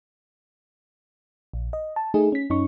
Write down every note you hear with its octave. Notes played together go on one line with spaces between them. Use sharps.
A#1
D#5
A5
A3 D#4 G#4
C#4 B6
F#2 C#4 D#4 C#6